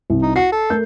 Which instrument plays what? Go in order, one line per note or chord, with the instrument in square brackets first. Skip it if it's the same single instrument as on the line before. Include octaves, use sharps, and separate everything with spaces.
[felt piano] C2
[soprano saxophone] D#4
[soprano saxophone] F#4 [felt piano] C7
[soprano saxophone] A4
[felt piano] A3 A#4 G6